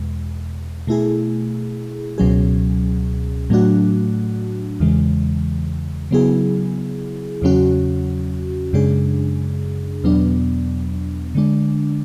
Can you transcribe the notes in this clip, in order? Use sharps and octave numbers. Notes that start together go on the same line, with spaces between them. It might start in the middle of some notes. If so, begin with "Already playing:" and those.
Already playing: E2 B2 G#3
B2 A3 E4 G#4
C#2 B2 F#3 C#4 G#4
A2 F#3 A3 D4 F#4
E2 C#3 E3 G#3
C#3 F#3 B3 E4 G#4
E2 C#3 F#3 C#4 F#4
F#2 C#3 G#3 D4 G#4
E2 B2 F#3 B3 D4
D3 G#3 D4